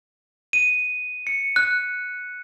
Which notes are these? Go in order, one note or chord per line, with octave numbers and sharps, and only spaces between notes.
D#7
C#7
F#6